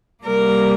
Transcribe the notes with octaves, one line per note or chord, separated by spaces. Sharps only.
C3 G3 A#3 A#4